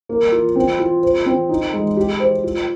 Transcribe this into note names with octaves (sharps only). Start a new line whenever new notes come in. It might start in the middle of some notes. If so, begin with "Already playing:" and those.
A#3
F4
C4
F4
C5
C4
D#4
G#3
G4
C5
F4